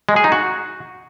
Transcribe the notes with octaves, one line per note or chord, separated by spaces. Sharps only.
G#3
G#4
D#4
F#4